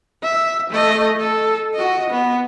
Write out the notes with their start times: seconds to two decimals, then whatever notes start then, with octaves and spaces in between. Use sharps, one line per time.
0.23 E5
0.70 A3 D#5
1.20 A4
1.74 F#4 D#5
2.10 B3